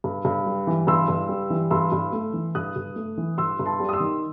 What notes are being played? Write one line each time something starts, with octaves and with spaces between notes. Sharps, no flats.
G2
G2
G3
E3
G2 C6 E6
G2
G3
E3
G2 C6 E6
G2
A3
E3
G2 D#6 F#6
G2
A3
E3
G2 C6 E6
G2
A5 C6
G3
D#6
C6 E6
D#3